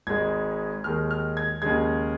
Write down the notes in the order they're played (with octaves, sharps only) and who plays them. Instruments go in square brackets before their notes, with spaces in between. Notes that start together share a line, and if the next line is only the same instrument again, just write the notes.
[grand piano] G#1 G#2 G#3 G#6
D#2 D#3 G#3 F6
F6
G#6
D#2 C#3 G#3 G#6